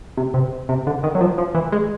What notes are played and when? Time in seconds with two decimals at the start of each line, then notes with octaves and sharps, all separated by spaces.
0.17 C3
0.34 C3
0.69 C3
0.87 D3
1.03 D#3
1.15 F#3
1.21 F3
1.38 F3
1.55 E3
1.72 G#3